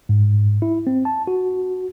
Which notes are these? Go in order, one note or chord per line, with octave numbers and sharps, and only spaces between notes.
G#2
E4
C4
A5
F#4